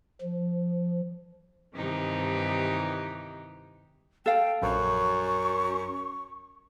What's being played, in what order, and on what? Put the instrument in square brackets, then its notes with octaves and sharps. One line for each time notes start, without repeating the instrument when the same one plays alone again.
[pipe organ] F3
[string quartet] G2 C3 D#3 E3 D#4 G4
[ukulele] A4 F5 [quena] G5
[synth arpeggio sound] A#1 [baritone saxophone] F#2 [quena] C#6